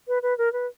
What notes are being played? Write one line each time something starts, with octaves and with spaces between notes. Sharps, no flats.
B4
B4
A#4
B4